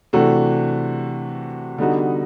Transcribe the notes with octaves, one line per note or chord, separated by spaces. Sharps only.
C3 E3 A3 D4 F#4
D3 G3 B3 D#4 F#4